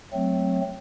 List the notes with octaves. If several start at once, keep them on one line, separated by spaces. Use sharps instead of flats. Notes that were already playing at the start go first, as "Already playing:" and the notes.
F#3 A3 C4